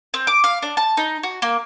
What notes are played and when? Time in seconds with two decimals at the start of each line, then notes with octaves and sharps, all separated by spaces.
0.14 C4
0.27 D6
0.44 F5
0.62 D4
0.77 A5
0.97 D#4
1.23 F#4
1.42 A#3